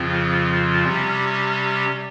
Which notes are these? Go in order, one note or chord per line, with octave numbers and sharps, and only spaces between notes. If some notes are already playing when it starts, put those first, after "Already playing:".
Already playing: F2 C#3 F3 C4 F4
C3 G3 C#4 G4